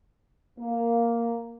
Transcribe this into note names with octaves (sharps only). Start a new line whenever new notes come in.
A#3